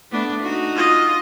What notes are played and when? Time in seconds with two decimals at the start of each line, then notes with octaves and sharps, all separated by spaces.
0.11 A3 B3 D4
0.43 D#4 F#4
0.76 F4 D#5